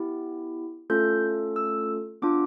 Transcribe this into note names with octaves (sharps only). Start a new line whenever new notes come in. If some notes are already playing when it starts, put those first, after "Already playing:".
Already playing: B3 E4 G4
A3 C#4 F4 A4 G6
E6
B3 D4 F4 D6